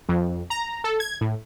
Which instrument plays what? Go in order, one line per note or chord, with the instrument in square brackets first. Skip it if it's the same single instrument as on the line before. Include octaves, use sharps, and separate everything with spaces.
[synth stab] F2
A#5
A4
G#6
A2